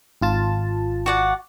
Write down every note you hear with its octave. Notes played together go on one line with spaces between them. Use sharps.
G#1 F4 A5
F#4 D5 F#5